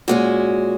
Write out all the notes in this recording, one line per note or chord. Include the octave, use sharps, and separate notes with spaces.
A#2 G#3 C#4 F#4